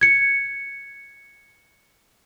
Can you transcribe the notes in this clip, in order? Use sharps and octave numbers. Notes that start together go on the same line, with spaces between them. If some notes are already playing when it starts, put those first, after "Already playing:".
G#6 C#7